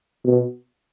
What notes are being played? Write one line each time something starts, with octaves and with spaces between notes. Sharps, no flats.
B2